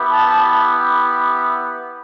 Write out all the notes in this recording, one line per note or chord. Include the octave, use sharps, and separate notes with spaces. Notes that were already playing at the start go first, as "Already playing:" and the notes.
Already playing: B3 E4 G4
A5